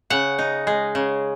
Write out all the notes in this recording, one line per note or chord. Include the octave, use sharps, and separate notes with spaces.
C#3 F#5
D#4
G#3
C#3